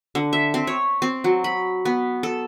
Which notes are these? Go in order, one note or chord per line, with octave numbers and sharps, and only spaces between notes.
D3
E5
C4
C#5
C4
F#3
B5
B3
A4